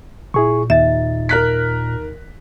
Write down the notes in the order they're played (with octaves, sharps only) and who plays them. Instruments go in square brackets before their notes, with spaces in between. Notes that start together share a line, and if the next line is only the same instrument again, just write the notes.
[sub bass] A#2 [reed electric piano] E4 G#4 C#6
[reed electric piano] D#2 D#4 A6 [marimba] E5
[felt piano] A#4 F#6 B6